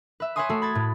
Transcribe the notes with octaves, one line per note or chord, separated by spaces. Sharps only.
B4 E5
B4 C#5 E5 G#5 C6 D#6
A3 F#4 A4 C7
B5 G#6 A6
A2